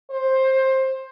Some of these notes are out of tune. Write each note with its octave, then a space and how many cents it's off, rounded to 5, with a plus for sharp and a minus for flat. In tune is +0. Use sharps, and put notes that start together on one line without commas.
C5 +15